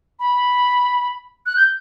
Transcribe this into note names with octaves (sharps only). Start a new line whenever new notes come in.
B5
F#6
G6